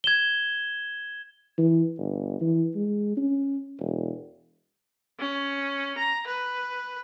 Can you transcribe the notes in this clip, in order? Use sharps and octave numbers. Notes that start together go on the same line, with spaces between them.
G#6 E7 G7
E3
G1
E3
G#3
C#4
E1
C#4
A#5
B4